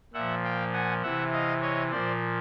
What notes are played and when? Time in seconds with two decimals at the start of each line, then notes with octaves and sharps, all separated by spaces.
0.14 A#2 F3 E5 F#5
0.44 F5 G5
0.73 F#5 G#5
1.03 C3 E3 E5 F#5
1.32 D#5 F5
1.62 C#5 D#5
1.92 A#2 F3 C5 D5